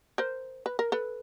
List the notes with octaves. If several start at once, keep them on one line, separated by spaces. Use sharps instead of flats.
A#4 C5
B4
A#4
A4 B4